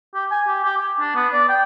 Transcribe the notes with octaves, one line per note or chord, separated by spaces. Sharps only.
G4
G#5
G4
G4
D6
D4
B3
D5
G5